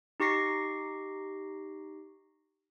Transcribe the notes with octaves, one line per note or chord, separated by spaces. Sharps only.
D#4 G4 C#6 A#6 C7